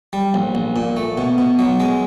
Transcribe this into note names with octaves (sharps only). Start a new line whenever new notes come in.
G3
A#1
A#1
A#2
A3
B2
B2
F#3
G#3